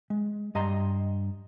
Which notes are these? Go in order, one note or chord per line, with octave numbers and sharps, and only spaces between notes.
G#3
G2 D#5 A#5 C6